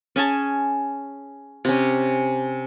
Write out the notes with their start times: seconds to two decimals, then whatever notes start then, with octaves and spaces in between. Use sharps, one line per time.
0.16 C#4 G#4 G#5 A5
1.65 C3 C#4